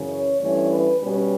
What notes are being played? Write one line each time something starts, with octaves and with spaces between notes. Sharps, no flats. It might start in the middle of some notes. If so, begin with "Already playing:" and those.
Already playing: F#2 C#3 E3
C#5
G2 E3 A3 C#4 C#5
B4
B2 G3 C#4 B4